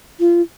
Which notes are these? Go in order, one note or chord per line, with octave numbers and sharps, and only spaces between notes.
F4